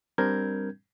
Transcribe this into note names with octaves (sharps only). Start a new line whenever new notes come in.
G3 C4 D4 A#4 G6 G#6